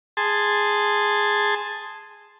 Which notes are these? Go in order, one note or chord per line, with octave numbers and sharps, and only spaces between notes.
G#4 A5 C6